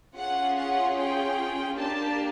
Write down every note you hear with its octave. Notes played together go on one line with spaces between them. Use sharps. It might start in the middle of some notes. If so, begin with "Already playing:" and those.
C#4 F4 G#4 F#5
F#5
G5
A#3 D4 G4 A5